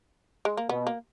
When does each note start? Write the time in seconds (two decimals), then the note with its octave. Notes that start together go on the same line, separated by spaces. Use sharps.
0.45 G#3
0.57 A#3
0.69 B2 B3
0.87 A#3